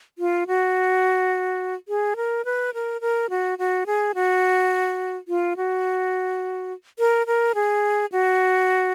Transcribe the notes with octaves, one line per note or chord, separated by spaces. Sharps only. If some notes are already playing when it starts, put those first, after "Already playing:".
F4
F#4
G#4
A#4
B4
A#4
A#4
F#4
F#4
G#4
F#4
F4
F#4
A#4
A#4
G#4
F#4